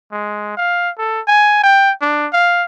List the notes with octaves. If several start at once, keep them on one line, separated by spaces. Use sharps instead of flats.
G#3
F5
A4
G#5
G5
D4
F5